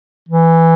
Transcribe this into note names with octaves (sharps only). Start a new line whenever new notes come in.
E3